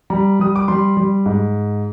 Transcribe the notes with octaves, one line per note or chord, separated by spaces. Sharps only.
G3 A#5
G3 D#6
D6
G3 C6
G3
G#2